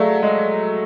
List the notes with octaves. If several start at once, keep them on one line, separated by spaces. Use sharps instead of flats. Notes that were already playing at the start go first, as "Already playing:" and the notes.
Already playing: F#3 A3 G#4 D5 F5
G#3